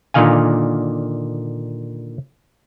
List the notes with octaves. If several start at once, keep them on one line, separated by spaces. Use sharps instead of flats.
A#2 D3 D#3 F5 G#5